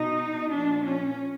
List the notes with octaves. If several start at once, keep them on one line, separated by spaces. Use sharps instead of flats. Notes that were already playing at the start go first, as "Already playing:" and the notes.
Already playing: B2 D#4
A#2 F3 D4
C#4